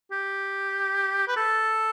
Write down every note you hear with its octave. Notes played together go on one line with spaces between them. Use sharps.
G4
B4
A4